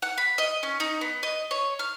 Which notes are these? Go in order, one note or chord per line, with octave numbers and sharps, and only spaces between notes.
F#5
B5
D#5
C#4
D#4
B3
D#5
C#5
F6